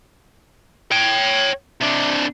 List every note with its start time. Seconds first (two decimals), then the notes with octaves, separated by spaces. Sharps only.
0.91 C#5 G5
1.81 C3 D4